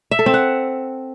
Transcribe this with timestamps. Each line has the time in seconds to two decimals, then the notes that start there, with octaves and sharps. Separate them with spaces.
0.11 E5
0.19 A4
0.26 C4
0.34 F#5